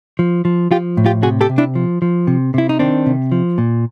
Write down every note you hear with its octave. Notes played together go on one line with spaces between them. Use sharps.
F3
F3
F3 F4 G4
A2
F4 G4
C3 F#4 G#4
G4 A4
C3
D4 E4
F3
F3
C3
C3 E4
D#4
D#3 C4 D4
C3
F3
A#2